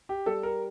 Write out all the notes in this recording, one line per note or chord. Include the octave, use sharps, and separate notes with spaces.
G4
G3 A4
A#4